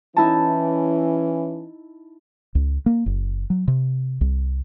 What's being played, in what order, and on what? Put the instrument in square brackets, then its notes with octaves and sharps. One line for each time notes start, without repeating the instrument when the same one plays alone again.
[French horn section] E3 C#4 [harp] D#4 E4 A5
[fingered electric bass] C#2
A#3
F#1
F#3
C3
C2